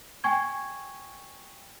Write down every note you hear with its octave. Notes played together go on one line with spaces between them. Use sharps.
G5 G#5 C#6 G#6